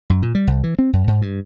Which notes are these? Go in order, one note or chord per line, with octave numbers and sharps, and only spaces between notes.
F#2
A#2
G3
C2
E3
C4
F#2
G#2
G2